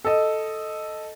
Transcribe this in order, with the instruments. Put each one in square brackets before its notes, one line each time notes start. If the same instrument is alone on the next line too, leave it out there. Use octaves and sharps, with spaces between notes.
[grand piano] A4 D#5